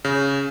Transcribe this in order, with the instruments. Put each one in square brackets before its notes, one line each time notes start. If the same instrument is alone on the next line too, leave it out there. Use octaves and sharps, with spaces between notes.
[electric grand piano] C#3